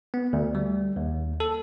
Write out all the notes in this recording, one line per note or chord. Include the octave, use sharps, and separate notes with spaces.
B3
D2
G3
D#2
A4